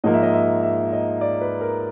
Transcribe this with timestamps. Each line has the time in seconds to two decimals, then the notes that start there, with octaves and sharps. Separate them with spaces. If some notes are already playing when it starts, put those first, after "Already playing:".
0.04 G#2 F3 A#3 D#5
0.14 E5
0.23 D#5
0.34 E5
0.63 E5
0.93 D#5
1.21 D5
1.41 B4
1.61 A#4